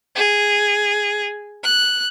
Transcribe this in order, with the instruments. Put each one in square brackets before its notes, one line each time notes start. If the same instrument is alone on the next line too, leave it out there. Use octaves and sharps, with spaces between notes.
[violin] G#4
F#6